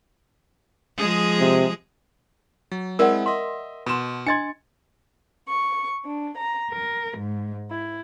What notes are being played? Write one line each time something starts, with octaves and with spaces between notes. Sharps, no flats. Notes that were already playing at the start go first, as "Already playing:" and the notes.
F3 G#3 G#4
C3
F#3
G#3 C4 E4 A#4 D5 F#5
D#5 E5 C6
B2 B5 C6 E7
D4 D#5 C6 G#6 A6 C#7
C#6
D4
A#5
A#4
G#2
E4